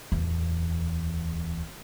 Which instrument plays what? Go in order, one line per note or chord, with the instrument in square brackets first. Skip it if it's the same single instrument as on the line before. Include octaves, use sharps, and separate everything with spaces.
[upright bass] D1 E2